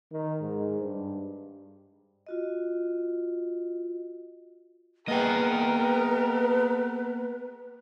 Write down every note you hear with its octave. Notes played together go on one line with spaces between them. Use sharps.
D#3
G#2
G2
F4 F#4 D#5
A#3 B3 G#4 A#4 B4 D#5 G5